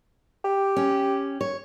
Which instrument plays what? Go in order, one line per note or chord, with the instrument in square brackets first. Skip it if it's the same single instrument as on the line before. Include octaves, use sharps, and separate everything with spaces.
[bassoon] G4
[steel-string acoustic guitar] C#4
C#5